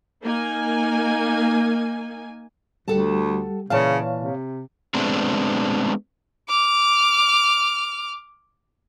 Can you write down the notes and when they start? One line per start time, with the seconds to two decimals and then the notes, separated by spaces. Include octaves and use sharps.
0.23 A#3 D#4 G#5
2.88 D2 G3 G4 A4 F#5 A5
3.70 A#2 C#3 E3 C#5 F5 A5
4.17 C3
4.94 G#3 A3 B3 C4 D4
6.49 D6 F6